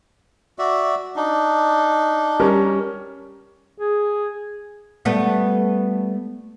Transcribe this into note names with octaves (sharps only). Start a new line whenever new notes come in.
F#4 D5 E5
D4 D#4
G3 C#4 A#4
G#4
G3 A3 B3